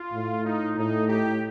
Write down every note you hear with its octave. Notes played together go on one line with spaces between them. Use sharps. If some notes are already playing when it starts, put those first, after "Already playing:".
Already playing: F4
A2
D#4
A2 D#4
G4